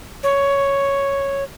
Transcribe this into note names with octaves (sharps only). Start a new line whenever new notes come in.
C#5